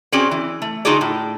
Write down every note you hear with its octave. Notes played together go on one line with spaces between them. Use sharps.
C4 C#4 F#4 G#4 D5
E3
A3
D3 D#4 F4 F#4 G#4 D5
A2